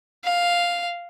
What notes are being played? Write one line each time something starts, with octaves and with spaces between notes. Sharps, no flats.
F5